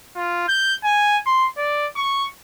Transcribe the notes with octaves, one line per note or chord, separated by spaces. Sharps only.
F4
G6
G#5
C6
D5
C#6